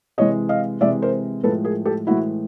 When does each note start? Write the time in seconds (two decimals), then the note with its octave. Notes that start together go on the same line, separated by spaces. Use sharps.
0.18 C3 E3 G#3 C#5 D#5
0.49 D#5 F5
0.81 C3 E3 G#3 D5 E5
1.02 A#4 C5
1.44 A2 F3 G#3 A4 B4
1.65 G#4 A#4
1.86 G4 A4
2.07 A2 E3 G#3 E4 F#4